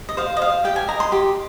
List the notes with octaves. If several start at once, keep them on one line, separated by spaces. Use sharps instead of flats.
D#5
C5 F5
D#5
C5 F5
G4 G5
G#5
D#5 A#5
C6
G4 C6